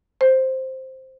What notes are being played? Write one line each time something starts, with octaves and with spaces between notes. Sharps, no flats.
C5